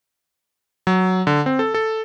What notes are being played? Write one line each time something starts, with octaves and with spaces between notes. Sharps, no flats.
F#3
D3
C4
A4
A4